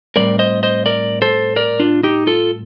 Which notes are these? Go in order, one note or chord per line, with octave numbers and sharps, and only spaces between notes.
A2 G3 C4 A#4 D5
C5 D#5
C5 D#5
A#4 D5
A4 C5
A#4 D5
D4 F4
D#4 G4
F4 A4